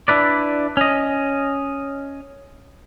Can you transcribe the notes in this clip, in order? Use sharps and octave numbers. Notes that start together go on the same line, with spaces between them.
D4 E4 B4 D5
C#4 D#5